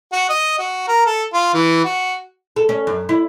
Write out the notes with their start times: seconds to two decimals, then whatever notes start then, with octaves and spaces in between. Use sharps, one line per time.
0.12 F#4
0.29 D#5
0.58 F#4
0.88 A#4
1.06 A4
1.33 F4
1.53 E3
1.85 F#4
2.56 A4
2.69 C#4
2.87 F#2
3.09 E4